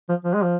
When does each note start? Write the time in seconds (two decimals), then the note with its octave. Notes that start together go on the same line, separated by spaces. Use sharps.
0.09 F3
0.24 F3
0.34 G#3
0.43 F3